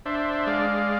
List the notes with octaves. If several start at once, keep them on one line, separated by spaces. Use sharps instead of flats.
D4 C5 E5
G#3 D5 F5